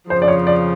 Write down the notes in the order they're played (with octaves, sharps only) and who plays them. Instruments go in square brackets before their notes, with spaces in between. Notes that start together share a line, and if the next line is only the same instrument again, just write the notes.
[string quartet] F2 C#3 F3 [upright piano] C5
[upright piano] D5
C#5
D5